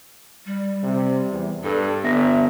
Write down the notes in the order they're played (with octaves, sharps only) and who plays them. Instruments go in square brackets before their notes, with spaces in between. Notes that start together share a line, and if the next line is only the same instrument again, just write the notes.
[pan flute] G3
[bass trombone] C3
E2
[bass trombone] G2 [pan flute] A4
[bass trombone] G1 [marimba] B3 A#6 [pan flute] E5